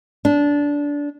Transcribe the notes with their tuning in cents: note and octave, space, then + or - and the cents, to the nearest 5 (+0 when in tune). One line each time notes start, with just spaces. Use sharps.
D4 -20